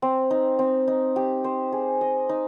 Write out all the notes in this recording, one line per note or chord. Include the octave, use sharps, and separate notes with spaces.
C4
D#4
C4
D#4
G4
C5
G#4
D#5
D#4